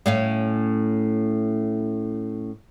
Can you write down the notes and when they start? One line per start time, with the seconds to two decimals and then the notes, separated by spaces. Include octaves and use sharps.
0.06 A2 C#4 F5